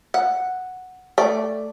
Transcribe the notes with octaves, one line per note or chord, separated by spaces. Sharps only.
F#5
A3 D5